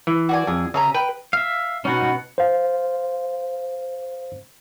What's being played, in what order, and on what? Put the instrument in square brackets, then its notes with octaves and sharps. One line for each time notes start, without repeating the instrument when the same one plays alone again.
[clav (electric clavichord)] E3
[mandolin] F#4 D5 G#5
[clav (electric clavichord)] F2 [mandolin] G#4
[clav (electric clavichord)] C#3 [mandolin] E5 G#5 A#5
[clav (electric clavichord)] B4 [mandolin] G5
[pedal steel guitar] E5 F5
[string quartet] B2 F#5 [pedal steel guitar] C#4 D#4 F#4
[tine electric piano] C5 F5